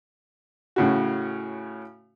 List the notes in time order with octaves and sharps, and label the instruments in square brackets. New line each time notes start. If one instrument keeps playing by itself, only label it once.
[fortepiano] A2 C#3 F#4